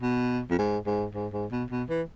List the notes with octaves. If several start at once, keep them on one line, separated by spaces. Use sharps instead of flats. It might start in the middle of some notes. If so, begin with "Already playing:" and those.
B2
F2
G#2
G#2
G#2
G#2
B2
B2
E3